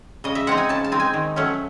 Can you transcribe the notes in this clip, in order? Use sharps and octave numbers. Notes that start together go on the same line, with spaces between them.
C#3 D#5
E5
G#3 C4 D#4 F#5
G#5
C#3 A5
A5
G#3 C4 D#4
G#5
D#3
F#3 A3 C#4